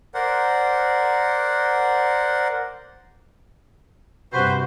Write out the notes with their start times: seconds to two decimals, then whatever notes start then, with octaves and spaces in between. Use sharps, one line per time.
0.14 A#4 C5 D5 F#5
4.33 G2 C3 F#4 B4 C5